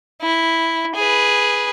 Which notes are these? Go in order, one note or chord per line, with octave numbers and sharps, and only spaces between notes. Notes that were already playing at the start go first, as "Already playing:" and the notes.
E4
G#4 B4